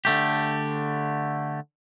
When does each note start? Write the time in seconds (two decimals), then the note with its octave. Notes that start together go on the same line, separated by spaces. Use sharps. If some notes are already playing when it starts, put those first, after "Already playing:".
0.05 D3 A3 G4